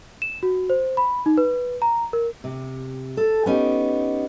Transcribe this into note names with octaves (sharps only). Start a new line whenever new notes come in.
E7
F#4
C5
B5
D#4
B4
A#5
A#4
C3
A4
B3 C#4 D#4 G4